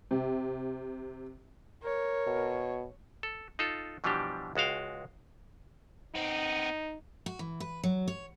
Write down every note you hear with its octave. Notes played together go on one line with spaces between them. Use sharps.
C3
A#4 C#5
B2
A4
D#4 F4 A4
B2 E3 F3 G3 D4 G4
C#2 G#3 F#4 F5 G5
B3 C4 D#4
F#4
E3
B4
F#3
C#5